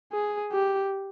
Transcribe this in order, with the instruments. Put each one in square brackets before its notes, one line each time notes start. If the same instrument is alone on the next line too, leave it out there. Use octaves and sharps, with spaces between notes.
[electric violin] G#4
G4